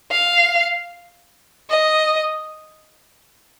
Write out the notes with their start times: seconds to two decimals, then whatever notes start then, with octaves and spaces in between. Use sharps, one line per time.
0.11 F5
1.71 D#5